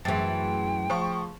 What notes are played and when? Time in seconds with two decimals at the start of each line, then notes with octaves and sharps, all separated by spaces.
0.05 F#2 E3 A3 G#4 G5 C6 A6
0.90 F3 C#6